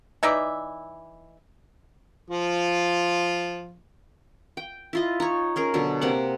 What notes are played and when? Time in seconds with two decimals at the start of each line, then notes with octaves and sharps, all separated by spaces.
0.23 E3 D#4 D5 E5
2.30 F3 F4
4.57 G5
4.93 E4 F4 D#5
5.20 D#4 C#5
5.56 C#4 G#4 A#4
5.74 B2 D3 F#3
6.01 C3 A#3 C4 F#5